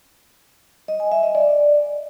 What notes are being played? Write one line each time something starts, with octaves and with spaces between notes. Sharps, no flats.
D#5
G#5
E5
D#5
D5